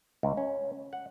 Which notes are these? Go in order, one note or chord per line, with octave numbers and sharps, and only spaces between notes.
C#2
C#4
F#5